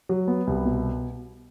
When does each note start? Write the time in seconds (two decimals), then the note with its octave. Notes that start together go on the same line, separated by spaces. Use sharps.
0.09 F#3
0.28 B3
0.47 C2
0.65 B2